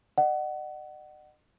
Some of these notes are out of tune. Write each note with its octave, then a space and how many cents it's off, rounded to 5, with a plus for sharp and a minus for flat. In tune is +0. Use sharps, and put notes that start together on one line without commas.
D#5 -45 F#5 +20